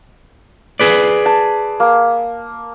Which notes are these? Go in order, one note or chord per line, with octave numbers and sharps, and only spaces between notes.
G#4 B4 D5
A5
A#3